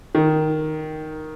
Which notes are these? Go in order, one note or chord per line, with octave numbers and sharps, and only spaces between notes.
D#3